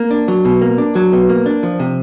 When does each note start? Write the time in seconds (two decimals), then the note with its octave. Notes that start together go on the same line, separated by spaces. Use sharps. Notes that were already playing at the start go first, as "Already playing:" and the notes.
Already playing: A#3
0.11 D4
0.28 F#3
0.45 B2
0.61 A#3
0.78 D4
0.95 F#3
1.12 B2
1.29 A#3
1.46 D4
1.63 F3
1.79 C3